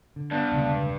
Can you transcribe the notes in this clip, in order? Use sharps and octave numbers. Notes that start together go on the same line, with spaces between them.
D3
G2 B3 D4
E1 C#2 D3